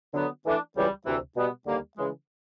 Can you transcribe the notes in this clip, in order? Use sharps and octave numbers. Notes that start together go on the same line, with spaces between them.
D3 F#3 B3
E3 A3 D4
C#2 C#3 E3 G3
D2 C3 E3
B2 G3 B3
D#2 D3 G3 A#3
C#3 E3 G#3